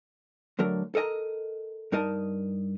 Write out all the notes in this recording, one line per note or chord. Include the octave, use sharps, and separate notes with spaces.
D3 F#3 A3 A#4
A4 A#4 D#5 G#5 A#5
G2 D#4 A#4 D#5 A5